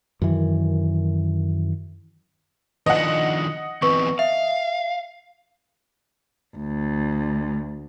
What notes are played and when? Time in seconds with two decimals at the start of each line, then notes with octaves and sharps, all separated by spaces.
0.22 F#2 D#3 E3
2.86 D#3 F3 D4 D#5 F#5
3.82 E3 B3 C4 B4 C#6
4.19 E5 F5
6.57 D2